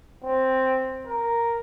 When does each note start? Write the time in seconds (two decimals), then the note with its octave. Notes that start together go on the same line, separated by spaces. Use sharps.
0.24 C4
1.07 A#4